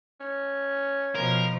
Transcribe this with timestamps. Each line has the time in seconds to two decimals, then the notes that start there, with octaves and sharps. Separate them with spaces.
0.20 C#4
1.15 B2 F3 A#4